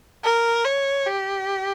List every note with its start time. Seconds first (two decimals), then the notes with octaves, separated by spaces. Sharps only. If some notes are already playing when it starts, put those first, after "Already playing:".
0.24 A#4
0.65 C#5
1.07 G4